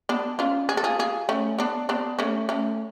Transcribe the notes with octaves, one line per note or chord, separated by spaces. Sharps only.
B3 D4
C#4 F4
G#4
A4
F4 G#4
F4 G#4
A3 C#4
B3 D4
B3 D4
A3 C#4
A3 C#4